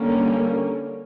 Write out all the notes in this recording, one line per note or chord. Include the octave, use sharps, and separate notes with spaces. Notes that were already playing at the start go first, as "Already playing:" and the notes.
Already playing: D3 G3 A#3 C#4